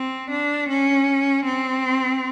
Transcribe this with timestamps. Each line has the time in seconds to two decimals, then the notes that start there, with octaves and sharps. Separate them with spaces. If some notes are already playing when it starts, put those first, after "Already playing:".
Already playing: C4
0.31 D4
0.69 C#4
1.46 C4